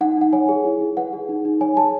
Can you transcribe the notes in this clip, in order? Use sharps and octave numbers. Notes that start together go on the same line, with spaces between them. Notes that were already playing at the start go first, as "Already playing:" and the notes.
D#4 F#5
D#4 F#5
C#5 G#5
G#4
E4
E4
B4 F#5
G#4
D#4
D#4
C#5 G#5
G#4 A5